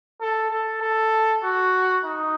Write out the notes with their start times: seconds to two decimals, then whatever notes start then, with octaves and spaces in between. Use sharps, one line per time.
0.21 A4
0.51 A4
0.82 A4
1.44 F#4
2.05 D#4